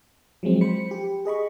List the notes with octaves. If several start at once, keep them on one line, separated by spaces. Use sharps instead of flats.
F3 F#3 G#3 C4
C5 B5 C#7
G4
G#4 D#5 B5 C#6